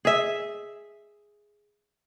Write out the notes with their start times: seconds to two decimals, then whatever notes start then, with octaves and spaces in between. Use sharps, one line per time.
0.05 G#4 E5